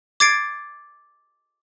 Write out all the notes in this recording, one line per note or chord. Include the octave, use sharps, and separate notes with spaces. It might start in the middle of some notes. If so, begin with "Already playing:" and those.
D6 G#6 A6 C7 D7